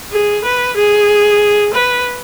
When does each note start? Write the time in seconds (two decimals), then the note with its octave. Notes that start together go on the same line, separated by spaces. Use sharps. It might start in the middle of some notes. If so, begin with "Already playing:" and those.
0.12 G#4
0.44 B4
0.76 G#4
1.73 B4